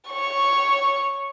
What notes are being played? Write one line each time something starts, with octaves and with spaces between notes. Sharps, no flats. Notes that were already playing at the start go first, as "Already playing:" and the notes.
C#5 C#6